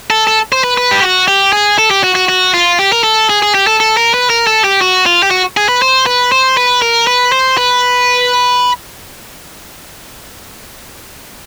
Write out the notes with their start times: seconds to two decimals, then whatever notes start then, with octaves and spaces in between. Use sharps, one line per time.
0.10 A4
0.27 A4
0.52 C5
0.64 B4
0.78 B4
0.91 G4
1.02 F#4
1.28 G4
1.53 G#4
1.78 A4
1.91 G4
2.03 F#4
2.15 F#4
2.29 F#4
2.54 F4
2.79 G4
2.92 A#4
3.04 A4
3.30 G#4
3.42 G#4
3.55 G4
3.67 A4
3.80 A4
3.97 A#4
4.14 B4
4.30 A#4
4.47 A4
4.64 G4
4.81 F#4
5.06 F4
5.23 G4
5.31 F#4
5.57 G#4
5.69 B4
5.82 C5
6.06 B4
6.32 C5
6.57 B4
6.82 A#4
7.07 B4
7.32 C5
7.57 B4